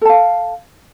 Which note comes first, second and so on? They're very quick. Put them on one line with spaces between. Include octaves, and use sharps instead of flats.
A4 A5 F5